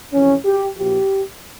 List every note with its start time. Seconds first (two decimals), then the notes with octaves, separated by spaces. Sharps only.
0.13 F2 C3 E3 C#4
0.45 G4
0.76 A#1 A#2 F3 G4